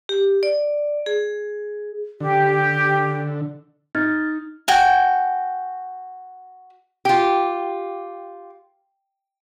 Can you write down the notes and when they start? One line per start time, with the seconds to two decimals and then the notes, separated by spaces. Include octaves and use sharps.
0.09 G4
0.43 D5
1.06 G#4
2.20 D3 G4
3.95 D#4 F6 G#6 A6
4.68 F#4 G5 G#5
7.05 F4 G4 G5